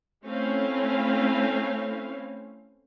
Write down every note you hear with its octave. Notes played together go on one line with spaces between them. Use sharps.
A3 C4 C#4 E4 F5